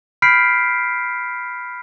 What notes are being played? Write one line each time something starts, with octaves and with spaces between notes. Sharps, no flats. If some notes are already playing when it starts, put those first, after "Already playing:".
B5 F6 G6 B6 C7 D7